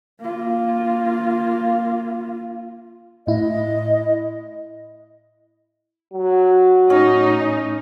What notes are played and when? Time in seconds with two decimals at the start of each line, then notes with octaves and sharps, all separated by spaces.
0.20 A#3 F4
3.27 A2 E4 D#5
6.13 F#3
6.90 A2 C#4 D#4